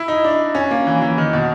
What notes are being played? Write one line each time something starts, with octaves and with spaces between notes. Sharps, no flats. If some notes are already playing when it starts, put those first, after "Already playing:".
Already playing: E4
D#4
D4
C#4
A#3
E3
E3
D#3
B2